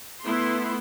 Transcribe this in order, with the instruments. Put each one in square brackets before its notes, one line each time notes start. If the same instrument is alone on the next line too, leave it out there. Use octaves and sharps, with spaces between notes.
[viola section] A3 B3 E4 C6